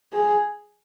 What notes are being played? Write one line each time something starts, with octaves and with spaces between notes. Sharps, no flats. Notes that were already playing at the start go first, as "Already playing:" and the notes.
G#4